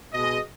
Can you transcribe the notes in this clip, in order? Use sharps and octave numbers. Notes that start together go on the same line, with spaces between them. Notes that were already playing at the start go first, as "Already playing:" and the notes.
B2 G#3 D#5